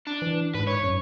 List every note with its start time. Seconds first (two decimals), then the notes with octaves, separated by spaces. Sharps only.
0.07 D4
0.22 E3
0.55 G#2 B4
0.67 C#5
0.83 F#2